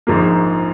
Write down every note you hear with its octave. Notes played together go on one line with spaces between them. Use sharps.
A#1 G#2 F3 A#3